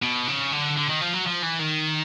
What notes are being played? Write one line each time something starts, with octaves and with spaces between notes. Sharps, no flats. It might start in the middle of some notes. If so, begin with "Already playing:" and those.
B2
C#3
D3
D3
D#3
F3
F#3
F3
E3
D#3